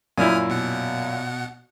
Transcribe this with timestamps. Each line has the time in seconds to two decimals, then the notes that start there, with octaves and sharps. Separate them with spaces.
0.18 F#2 A#2 E4 G#5 D#6 F6
0.49 B2 F#5